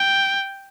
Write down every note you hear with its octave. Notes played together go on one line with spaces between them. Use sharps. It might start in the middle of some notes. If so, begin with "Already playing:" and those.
Already playing: G5